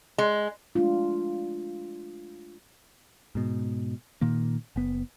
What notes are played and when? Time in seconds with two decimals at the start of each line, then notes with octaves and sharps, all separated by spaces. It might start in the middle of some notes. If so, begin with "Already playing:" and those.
0.18 G#3
0.75 G#3 A3 D4 F4
3.35 G#2 B2
4.21 A#2 D#3 A#3
4.76 F#1 B3